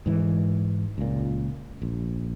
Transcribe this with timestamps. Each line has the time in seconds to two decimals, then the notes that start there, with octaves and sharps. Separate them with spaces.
0.06 G#2 E3 G#3
0.98 C#2 A#2
1.82 A#1